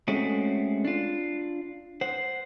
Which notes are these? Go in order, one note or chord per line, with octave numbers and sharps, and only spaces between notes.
G#3 A3 C4 C#4 F#4
D4 F4
C5 F#5